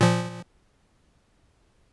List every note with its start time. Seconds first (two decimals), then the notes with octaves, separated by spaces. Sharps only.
0.01 A#2 F3